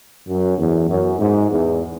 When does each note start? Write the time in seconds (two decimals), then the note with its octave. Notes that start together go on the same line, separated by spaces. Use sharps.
0.28 F#2
0.58 E2
0.89 F#2
1.19 G#2
1.49 E2